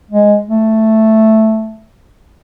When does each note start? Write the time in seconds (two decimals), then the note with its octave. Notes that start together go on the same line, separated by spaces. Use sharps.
0.11 G#3
0.48 A3